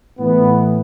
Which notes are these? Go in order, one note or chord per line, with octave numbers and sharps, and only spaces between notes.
A2 E3 B3